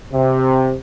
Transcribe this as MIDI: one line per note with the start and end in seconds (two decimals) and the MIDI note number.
0.13 0.74 48